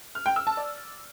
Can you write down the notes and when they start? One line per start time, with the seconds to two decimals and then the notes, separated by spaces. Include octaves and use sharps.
0.15 F6
0.26 G5
0.36 E6
0.47 A5
0.57 D5